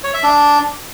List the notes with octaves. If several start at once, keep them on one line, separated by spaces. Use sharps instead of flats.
C#5
E5
D4